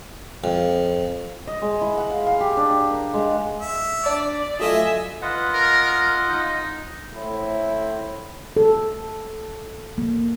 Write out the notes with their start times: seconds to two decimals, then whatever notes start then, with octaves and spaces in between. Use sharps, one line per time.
0.44 F2
1.47 D#5
1.62 G#3
1.81 E4
1.98 F#5
2.10 F5
2.27 F5
2.40 G4
2.57 D4
2.71 G4
2.91 A#4
3.14 G#3
3.61 E5
4.06 D4 D5
4.60 F#3 A3 F4 D#5 E5 G#5
5.22 F4 B4 D#5 F#5
5.53 A#4
6.29 D#4
7.15 A2 C4 E4
8.57 A4
9.98 A#3